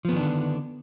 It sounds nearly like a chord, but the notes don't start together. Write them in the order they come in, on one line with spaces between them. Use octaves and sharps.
F3 B3 D#3 D4 D3